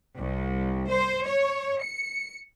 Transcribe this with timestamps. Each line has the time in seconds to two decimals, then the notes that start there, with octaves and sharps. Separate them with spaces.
0.17 C2
0.89 C5
1.26 C#5
1.81 C#7